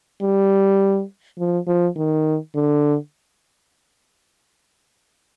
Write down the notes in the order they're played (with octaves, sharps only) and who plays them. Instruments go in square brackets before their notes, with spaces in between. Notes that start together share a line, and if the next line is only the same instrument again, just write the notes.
[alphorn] G3
F3
F3
D#3
D3